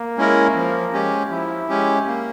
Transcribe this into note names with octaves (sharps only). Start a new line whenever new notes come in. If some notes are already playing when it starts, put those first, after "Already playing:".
Already playing: A#3
G#3 C#4 E4 A#4
F3
G#3 C#4 G4
F3 E4
G#3 C#4 G4
A#3